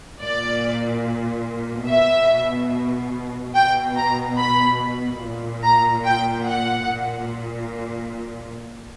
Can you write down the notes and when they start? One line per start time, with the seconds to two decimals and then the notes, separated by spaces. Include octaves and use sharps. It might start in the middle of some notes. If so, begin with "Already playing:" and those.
0.21 A#2 D5
1.87 B2 E5
3.55 B2 G5
3.97 A#5
4.38 B5
5.22 A#2
5.64 A#5
6.06 G5
6.47 F#5
6.89 A#2